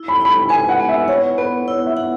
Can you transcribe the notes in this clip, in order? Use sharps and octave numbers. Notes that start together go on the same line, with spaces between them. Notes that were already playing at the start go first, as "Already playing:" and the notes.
Already playing: E4
B5
E4 B5
B4 G#5
F#5
B3
E5
C#5 F#5
B3 B4
E4 C#5
E5
F#5